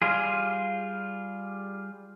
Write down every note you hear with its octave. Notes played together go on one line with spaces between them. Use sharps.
G3 F4 G#4